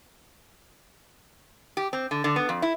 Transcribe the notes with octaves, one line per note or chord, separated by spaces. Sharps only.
G4
C4
D3
D3
B3
F2
E4